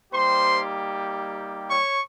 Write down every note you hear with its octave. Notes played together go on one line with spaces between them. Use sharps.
G3 A#3 D#4 G4 C5 C6
C#5 C#6